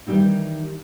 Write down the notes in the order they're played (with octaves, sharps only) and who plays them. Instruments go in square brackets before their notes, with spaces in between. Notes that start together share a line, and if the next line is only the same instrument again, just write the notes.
[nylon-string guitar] D#3 E3 F#3 G3 C4 D#4